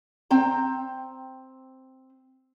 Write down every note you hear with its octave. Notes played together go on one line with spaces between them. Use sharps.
C4 G5 A#5